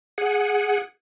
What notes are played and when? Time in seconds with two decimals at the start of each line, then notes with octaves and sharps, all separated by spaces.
0.18 G#4 F#5